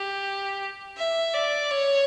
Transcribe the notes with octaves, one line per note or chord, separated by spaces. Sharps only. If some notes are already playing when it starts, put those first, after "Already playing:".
Already playing: G4
E5
D5
C#5